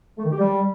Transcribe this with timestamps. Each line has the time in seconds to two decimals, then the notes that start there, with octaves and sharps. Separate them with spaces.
0.18 A3
0.25 D#3
0.32 G4
0.39 G3